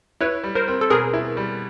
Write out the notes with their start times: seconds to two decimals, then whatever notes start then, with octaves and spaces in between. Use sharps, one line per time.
0.21 E4 B4 C#5
0.44 G3
0.55 A#4 C5
0.68 C4
0.81 A4
0.90 B2 G#4 A#4
1.14 E4
1.37 G3